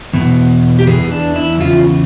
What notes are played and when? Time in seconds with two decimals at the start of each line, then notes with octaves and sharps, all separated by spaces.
0.13 E2 B2
0.79 G4
0.87 C#3 E3 G#4
0.91 E2
1.12 D4
1.36 E4
1.60 E2 C#3 F4